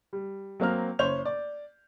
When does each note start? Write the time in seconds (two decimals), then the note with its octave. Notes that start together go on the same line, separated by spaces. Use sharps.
0.13 G3
0.60 F#3 A#3 C4 F6
0.99 F#1 C5 C#5 G6 F7
1.25 D5